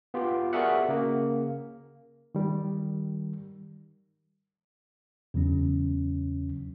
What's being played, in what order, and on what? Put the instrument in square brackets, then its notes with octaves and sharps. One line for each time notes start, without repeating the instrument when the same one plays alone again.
[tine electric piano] B3 F4 G4
F#4 G#4 A#4 D5 E5 F#5
C#3 A#3
[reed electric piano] D#3 G3
[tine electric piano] E2 C#3 F#3 C#4